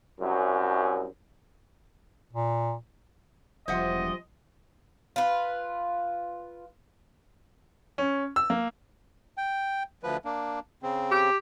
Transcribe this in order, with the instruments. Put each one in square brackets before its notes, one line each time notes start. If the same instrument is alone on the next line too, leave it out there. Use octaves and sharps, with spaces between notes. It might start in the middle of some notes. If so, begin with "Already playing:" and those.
[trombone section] C2 F#2
[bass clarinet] A#2
[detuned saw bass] E1 [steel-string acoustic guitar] F3 G3 [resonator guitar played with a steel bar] C5 E5 F#5 [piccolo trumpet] D#5
[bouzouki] F4 B4
[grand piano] C#4
E6
A#3
[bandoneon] G5
D2 F3 B4
A#3 D4
C#3 C4
[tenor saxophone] G4